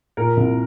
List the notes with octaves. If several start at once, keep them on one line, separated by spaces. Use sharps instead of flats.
A#2 A#4
C2